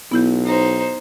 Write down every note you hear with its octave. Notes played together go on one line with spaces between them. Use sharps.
B1 B3 E4 G6
D#4 C5